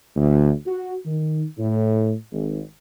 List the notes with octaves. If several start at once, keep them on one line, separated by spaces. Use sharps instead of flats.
D2
F#4
D#3
A2
G#1